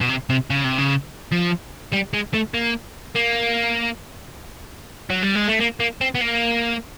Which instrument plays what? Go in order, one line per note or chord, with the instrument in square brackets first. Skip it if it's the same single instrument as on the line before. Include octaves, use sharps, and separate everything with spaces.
[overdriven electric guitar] B2
C3
C3
C#3
C3
C#3
F3
G3
G#3
A3
A#3
A#3
F#3
G3
G#3
A3
A#3
A#3
C4
B3
A#3